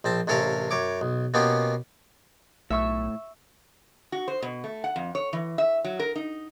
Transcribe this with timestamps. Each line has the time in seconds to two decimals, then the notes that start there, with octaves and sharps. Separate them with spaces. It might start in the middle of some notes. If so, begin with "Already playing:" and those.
0.04 A#1 C4 A5
0.27 A1 C3 C#4 A4 A#4 F5
0.71 F#2 C#5 D6
1.01 B1
1.34 B2 A#3 B3 C#4 F4 G4
2.70 B1 A2 E5 C#6 E6
4.12 F#4
4.28 C5
4.42 B2
4.64 A3
4.84 F#5
4.96 F2
5.15 C#5
5.33 E3
5.58 E5
5.85 F#3
6.00 A#4
6.16 D#4